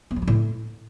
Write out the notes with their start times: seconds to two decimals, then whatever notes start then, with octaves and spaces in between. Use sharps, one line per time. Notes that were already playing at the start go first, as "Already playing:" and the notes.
0.11 B3
0.16 F3
0.22 A#3
0.28 A2